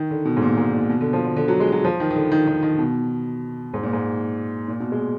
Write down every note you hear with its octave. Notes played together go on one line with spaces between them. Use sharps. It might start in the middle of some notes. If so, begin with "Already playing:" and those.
Already playing: D#3
D3
B2
G#2
A#2
G#2
A#2
B2
D3
F3
D3
D3
F#3
G#3
F#3
F3
D#3
D#3
D3
D#3
D#3
D#3
B2
G#2
A#2
G#2
A#2
B2
G#3